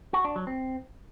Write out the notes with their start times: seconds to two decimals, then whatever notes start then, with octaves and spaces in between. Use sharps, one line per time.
0.13 F#4
0.25 D4
0.36 F#3
0.47 C4